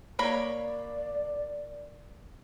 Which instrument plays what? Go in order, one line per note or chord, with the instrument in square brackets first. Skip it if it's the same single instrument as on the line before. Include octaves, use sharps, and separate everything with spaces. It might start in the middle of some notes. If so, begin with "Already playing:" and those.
[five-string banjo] A#3 C#5 B5 [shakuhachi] D5